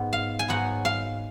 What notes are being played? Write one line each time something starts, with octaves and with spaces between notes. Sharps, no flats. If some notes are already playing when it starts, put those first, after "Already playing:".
Already playing: G#2 B3
F5
G#5
G#2 F#3 B3 F#5
F5